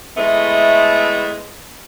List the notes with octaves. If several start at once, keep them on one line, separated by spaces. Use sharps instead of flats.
A2 G#3 A3 B3